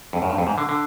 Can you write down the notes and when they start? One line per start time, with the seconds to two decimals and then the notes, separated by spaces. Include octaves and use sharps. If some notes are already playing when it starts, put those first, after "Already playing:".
0.13 F2
0.22 F#2
0.30 G2
0.38 F2
0.47 G#2
0.58 D3
0.69 D3